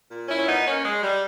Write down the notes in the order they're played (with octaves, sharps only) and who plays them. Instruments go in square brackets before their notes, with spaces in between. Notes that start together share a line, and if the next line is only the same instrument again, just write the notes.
[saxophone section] A#2
C#4 E4
C#4
B3 D#4
A#3 C#4
G#3
G3